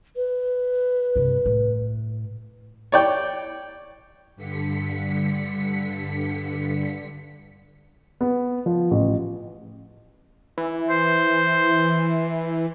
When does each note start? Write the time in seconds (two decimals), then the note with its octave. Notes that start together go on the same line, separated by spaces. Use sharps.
0.16 B4
1.16 G2 C3
1.46 A2
2.92 C#5 D5 G5
4.36 G2 D3 B6 C#7
8.21 B3
8.66 F3
8.91 A1
10.58 E3
10.90 C5